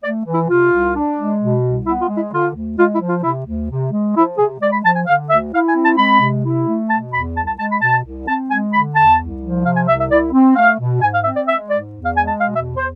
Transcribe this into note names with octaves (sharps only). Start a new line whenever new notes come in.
A3 D5
E3
E4
C3 F4
C2
D4
G#3
B2
C2
B3 E4
F4
G#3
E4
D3 F4
D2
G#3 F4
E4
F3
F4
C3 E4
D2
C3
G#3
F3 E4
C3 G#4
G#3 D5
B5
F3 A5
G#5
D3 F5
D2 E5
E4 F5
G#5
C4
A5
G#3 B5
C3
E4
A3
B2 A5
E2 B5
C2 A5
A5
G#3 A5
B5
B2 A5
C2
C4 A5
G#3 G#5
D3 B5
E2 A5
C2
F3
C3 F5
G#5
C2 E5
E5
E4 D5
C4
A3 F5
B2
G#2 G#5
F5
C4 E5
D5
G#3 E5
G#2 D5
E2
F5
G#3 G#5
A5
B2 F5
E5
E2
C5